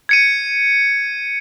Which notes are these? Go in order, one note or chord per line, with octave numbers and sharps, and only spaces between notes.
G#6 C#7 D#7